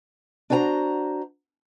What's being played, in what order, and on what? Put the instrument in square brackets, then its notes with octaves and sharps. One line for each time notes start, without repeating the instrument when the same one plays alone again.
[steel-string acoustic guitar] D4 F#4 C5 G#5 A#5